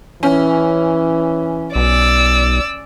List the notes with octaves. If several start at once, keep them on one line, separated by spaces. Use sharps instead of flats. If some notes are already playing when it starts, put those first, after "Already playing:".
E3 C#4
B1 D5 E6